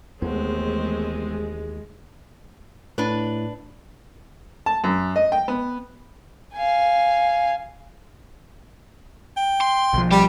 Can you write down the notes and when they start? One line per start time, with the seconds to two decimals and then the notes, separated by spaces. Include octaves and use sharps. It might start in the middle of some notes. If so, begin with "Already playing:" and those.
0.22 D#2 E3 G#3 A3 B3 C4
2.98 A2 D4 B4
4.66 A5
4.84 F#2
5.16 D#5
5.32 G5
5.48 B3
6.55 F5 G#5
9.37 G5
9.61 C6
9.93 B1 F3
10.11 G3 G4 G5